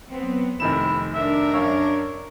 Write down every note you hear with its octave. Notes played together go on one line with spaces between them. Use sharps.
F#3 B3 C4
F1 F2 D#3 E4 E7
D4 A#4 E5
F#2 C#5 F5